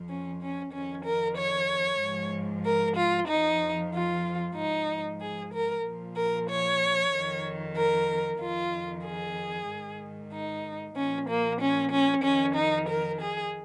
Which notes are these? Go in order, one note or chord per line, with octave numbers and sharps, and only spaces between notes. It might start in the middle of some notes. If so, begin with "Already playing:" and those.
Already playing: F2 F3
C#4
C#4
F2 D#3 C#4
A#4
C#5
G#2 F3
A#4
F4
F2 F3 D#4
F4
G#2 F3 D#4
G#4
A#4
A#2 F3
A#4
C#5
F2 D#3
A#4
F2 D#3 F4
G#4
G#2 D#3
D#4
A#2 F3 C#4
A#3
C#4
C#4
F2 D#3 C#4
D#4
A#4
G#4